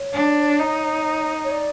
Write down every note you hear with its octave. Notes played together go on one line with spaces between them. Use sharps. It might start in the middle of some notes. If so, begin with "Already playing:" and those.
Already playing: C#5
D4
D#4
C#5
D5